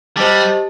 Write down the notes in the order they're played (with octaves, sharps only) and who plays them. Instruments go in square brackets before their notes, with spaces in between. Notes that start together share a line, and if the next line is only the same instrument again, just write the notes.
[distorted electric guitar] G3 [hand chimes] G4 C5 D#5 A5